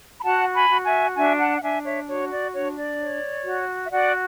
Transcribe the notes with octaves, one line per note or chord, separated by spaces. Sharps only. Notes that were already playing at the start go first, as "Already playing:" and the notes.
B5
F#4 F#5 A5
G#5 B5
F#4
E5 G#5
D4 E5 G#5
F#5 A5
F#5
D4 E5 G#5
C#5 E5
F#4 C#5
D5
D4 C#5
D5
C#5
F#4
E5
F#4 D5 F#5